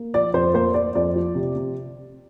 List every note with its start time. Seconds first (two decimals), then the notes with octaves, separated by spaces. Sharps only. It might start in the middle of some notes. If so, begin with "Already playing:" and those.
Already playing: A#3
0.14 F3 D5
0.34 F2 C5
0.54 A#3 C5
0.74 A#3 D5
0.95 F2 D5
1.16 F3
1.35 C3
1.55 C3